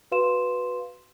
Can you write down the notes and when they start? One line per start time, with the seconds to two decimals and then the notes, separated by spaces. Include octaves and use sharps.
0.12 F#4 B4 F5 C6 E7